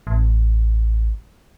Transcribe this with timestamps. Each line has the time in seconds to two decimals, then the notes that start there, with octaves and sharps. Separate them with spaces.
0.07 A1